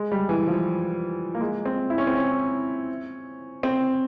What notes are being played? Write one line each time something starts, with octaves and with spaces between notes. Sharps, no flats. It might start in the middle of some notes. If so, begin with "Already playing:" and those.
Already playing: G#3
G3
E3
F3
A#3
G#3
C4
E4
C#4
C4
C#4
C4